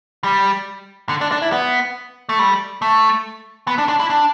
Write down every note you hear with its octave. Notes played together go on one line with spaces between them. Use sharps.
G3
D3
D4
D4
E4
B3
A3
G3
A3
B3
D4
D4
E4
D4